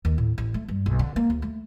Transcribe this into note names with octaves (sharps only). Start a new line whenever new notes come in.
D#2
A2
A1
A3
G2
B1
D3
A#3
D2
A3